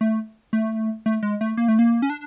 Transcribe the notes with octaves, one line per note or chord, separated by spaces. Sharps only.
A3
A3
A3
G#3
A3
A#3
A3
A#3
C#4
D4